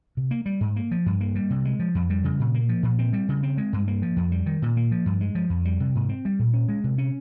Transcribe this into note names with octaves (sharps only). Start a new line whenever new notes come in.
C3
A#3
G3
G#2
A#3
F3
G2
A#3
G3
C3
G#3
F3
F2
G3
C#3
A#2
A#3
F3
A#2
C4
G3
C#3
C4
G#3
G2
A#3
F3
F2
G3
D#3
A#2
A#3
F3
G2
G#3
F3
F2
G3
C3
G#2
C4
G3
A#2
C#4
G#3
C3
C#4